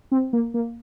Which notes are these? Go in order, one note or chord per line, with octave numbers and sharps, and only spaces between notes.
C4
A#3
A#3